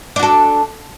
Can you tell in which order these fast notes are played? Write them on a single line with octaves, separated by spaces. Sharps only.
D4 F#4 A4